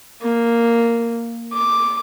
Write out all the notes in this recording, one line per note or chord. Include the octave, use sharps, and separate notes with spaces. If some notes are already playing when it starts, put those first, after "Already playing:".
A#3
D6